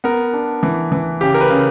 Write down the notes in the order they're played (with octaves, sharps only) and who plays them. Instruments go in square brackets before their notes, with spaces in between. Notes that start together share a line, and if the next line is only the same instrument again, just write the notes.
[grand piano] B3 A#4
D4
E3
E3
C#3 G4
A#4
B4
C#3